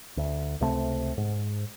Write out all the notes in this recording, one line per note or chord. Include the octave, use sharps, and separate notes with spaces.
D2
C#2 C3 A3 C4
G#2